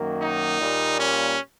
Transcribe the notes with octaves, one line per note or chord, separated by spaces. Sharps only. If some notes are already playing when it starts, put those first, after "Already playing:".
Already playing: F#2 D#3 F#3 A#3
D#4
A#2 G3 A#3
C#4